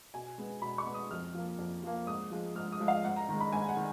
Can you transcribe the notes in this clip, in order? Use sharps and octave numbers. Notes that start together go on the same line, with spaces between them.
B2 G#5
G#3 B3
B2 B5
C#6
G#3 B3
D#6
F2 F6
F3 A#3
F2
F3 A#3
G#2 D#6
F3 G#3
G#2 F6
D#6
F3 G#3
F5
G#2 F#5
A#5
D#3 G#3 A#5
B5
G#2 G#5
F#5
D#3